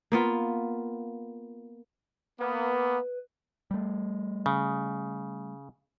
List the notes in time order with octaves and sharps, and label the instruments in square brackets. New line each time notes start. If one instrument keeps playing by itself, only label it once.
[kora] A#3 B3 F4
[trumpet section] A#3 B3 [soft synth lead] B4
[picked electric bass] G3 A3
[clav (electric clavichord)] C#3